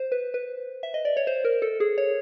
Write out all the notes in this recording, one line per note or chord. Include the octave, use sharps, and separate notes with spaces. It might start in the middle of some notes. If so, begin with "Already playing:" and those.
Already playing: C5
B4
B4
E5
D#5
D5
C#5
C5
A#4
A4
G#4
C#5